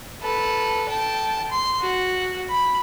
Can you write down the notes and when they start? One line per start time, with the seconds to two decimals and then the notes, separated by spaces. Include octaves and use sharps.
0.22 A4 B4
0.89 G5 A5
1.51 C6
1.81 F#4
2.50 B5